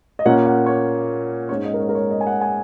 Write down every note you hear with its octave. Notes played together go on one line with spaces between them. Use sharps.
D#5
A#2 A#3 C#4 F#5
F#5
C#5
G#2 G#3 C#4 C#5
D#5
A#4
C#5
A#4
C#5
D#5
G#5
F#5
G#5